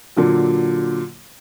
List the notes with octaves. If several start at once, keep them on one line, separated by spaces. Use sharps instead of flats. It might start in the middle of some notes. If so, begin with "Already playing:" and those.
A#2 D3 F#3